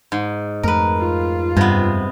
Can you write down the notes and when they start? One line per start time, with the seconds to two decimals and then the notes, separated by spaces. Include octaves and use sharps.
0.12 G#2
0.63 F2 A3 A#4 B4
0.97 F4
1.57 G2 C3 B3